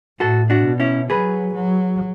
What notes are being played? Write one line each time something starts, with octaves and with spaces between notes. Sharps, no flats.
A2 F#4 A4
D4 F#4
B2
C#4 E4
F#3 G#4 B4
F#3